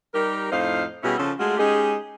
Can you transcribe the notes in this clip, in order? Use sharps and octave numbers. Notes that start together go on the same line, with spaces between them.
G3 D#4 G4 A#4
F2 A2 D#4 C5 F5
B2 G3 C#4 E4 F#4 G#4
C#3 F3 F4 A4
G#3 A3 F4 F#4 G#4
G#3 C#4 D#4 G4 G#4